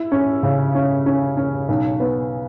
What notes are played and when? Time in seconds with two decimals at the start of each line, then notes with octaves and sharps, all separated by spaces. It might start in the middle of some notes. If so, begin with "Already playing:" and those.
Already playing: E4
0.12 C#4
0.43 C#3
0.75 C#4
1.06 C#4
1.37 C#4
1.68 B1
2.00 B3